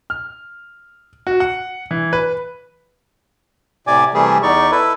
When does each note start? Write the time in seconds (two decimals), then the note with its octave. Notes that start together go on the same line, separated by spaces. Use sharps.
0.10 F6
1.27 F#4
1.40 F#5
1.91 E3
2.13 B4
3.87 A2 C3 D5 G#5 D6
4.14 C3 E3 G3 A3 G#4
4.43 E2 D#4 D5 C#6
4.71 E4 A4 B4